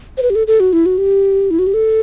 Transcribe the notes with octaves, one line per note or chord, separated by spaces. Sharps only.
C5
B4
G4
A4
A4
F#4
E4
F#4
G4
E4
F#4
G4
A4